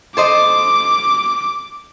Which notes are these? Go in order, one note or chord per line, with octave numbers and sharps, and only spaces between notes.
A4 C5 D#5 D6